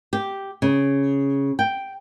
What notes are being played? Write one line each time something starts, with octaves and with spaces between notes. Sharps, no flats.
G4
C#3
G5